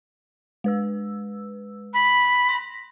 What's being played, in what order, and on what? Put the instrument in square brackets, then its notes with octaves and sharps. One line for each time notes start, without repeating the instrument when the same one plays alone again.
[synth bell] G#3 B4 E6
[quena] B5
[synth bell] C6 A#6 B6